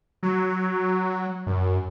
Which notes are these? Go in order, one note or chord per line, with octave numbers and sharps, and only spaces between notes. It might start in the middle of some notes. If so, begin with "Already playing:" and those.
F#3
F#2